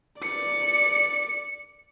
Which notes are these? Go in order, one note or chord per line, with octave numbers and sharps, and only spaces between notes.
D5 C#7